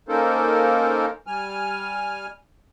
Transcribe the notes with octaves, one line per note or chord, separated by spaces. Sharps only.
A#3 C#4 D#4 A4 A#4 C5
G3 G#5 F6